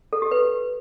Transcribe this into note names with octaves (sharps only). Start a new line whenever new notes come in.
A4
G4
B4